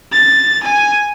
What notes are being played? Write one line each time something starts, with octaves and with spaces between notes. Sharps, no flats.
A6
G#5